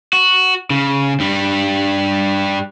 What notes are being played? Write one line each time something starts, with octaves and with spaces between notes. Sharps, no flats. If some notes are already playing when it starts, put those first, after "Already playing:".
F#4
C#3
G2 G3